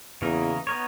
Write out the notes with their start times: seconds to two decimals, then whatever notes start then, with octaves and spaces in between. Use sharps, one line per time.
0.22 E2 C#3 E3 A#3 D#4 A#4
0.67 B3 D#4 A#4 C#5